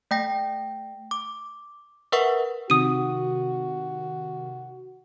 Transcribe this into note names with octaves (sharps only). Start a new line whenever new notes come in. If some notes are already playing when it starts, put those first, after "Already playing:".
A3 G5 A#6
D6
A#4 B4 E5 F#5 C#6
C3 D#3 F#4 D#6 D#7